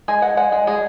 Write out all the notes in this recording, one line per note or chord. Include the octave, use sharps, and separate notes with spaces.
G#3 G#5
G#3 F#5
G#3 F#5
G#3
G#3 G#4